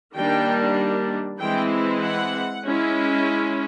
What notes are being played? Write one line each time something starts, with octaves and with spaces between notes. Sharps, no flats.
D#3 G3 A#3 D4 G5
E3 G#3 C4 E4 G5
F#5
G#3 C#4 E4